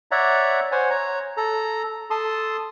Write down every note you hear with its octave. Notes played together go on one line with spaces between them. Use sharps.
C#5 D5 E5 F#5 A#5
C5 C#5 F#5 G#5
C#5 A#5
A4 A#5
A4 A5 C6 D#6